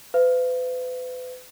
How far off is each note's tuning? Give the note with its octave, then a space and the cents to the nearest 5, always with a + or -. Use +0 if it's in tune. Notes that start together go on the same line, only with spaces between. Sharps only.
B4 +40 F5 -40